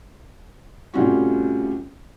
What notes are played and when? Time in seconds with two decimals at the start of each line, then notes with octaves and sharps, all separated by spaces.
0.94 A2 C3 G3 C#4 F4 F#4